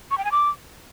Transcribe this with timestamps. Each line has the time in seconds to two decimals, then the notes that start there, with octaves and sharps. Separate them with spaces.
0.11 C#6
0.18 G5
0.25 G#5
0.32 D6